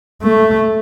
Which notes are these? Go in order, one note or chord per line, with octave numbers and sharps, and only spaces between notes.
A3